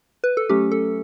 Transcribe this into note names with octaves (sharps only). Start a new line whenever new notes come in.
B4
A4
F#3 A3 C#4 G4
A4